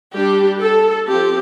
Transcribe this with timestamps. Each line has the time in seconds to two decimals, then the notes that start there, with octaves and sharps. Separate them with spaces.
0.14 G3 D4 G4
0.61 A4
1.08 F3 C4 G4